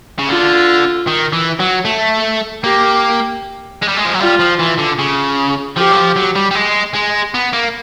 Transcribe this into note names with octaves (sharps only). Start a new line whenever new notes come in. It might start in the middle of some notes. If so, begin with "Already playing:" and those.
C#3
D3 F4
D#3
E3
F#3
A3
A#3 G4
G#3
G3
G#3
F3
F#3
G3 F4
F3
E3
D3
C#3
F3 G4
F#3
F3
F#3
G3
G3
G#3
G#3
B3
A#3